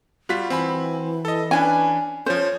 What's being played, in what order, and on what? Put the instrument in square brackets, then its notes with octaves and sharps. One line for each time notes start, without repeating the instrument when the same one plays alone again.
[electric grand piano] G3 F4 B6 [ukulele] F#4
[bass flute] E3 [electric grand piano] C4 G#5 B5
[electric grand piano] A4 D#5
[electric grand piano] C#4 D4 B4 [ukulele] G#5
[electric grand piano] F3 C#4 [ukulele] C5 [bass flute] C#5